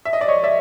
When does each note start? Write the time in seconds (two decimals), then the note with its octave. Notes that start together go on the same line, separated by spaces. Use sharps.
0.05 E5
0.13 D#5
0.21 D5
0.28 C#5 D#5
0.43 D5 E5